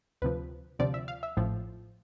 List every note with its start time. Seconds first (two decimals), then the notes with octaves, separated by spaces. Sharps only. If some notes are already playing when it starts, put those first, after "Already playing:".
0.22 D2 C3 F3 B4
0.79 D2 C3 F3 D5
0.94 E5
1.08 F5
1.23 E5
1.37 A1 A2 F3